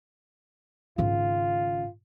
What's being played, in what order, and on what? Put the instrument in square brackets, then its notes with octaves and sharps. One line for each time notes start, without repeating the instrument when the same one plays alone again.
[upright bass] G#1 C#3 [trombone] F4